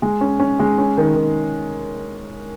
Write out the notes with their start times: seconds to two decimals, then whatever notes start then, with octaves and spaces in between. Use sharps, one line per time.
0.02 G#3
0.21 C#4
0.40 C#4
0.59 G#3
0.78 C#4
0.97 D#3
1.15 D#3